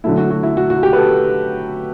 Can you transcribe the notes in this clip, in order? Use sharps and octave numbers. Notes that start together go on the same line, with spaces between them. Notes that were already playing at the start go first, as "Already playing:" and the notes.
D3 F#3 A3 E4
F#4
F#4
E4
F#4
F#4
G4
B4
A4